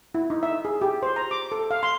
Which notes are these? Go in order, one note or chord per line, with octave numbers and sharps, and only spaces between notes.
E4
D#4
E5
G#4
G4
C5
A#5
D6
A4
F5
C6